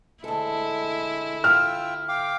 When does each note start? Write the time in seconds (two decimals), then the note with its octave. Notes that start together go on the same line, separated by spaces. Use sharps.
0.24 D2 G#3 E4 A4
1.44 F4 G5 E6 F6
2.08 F5 G5 D6